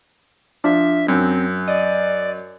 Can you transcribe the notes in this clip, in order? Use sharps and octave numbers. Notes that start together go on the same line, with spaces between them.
F3 D4 E5
F#2 C4
D5 D#5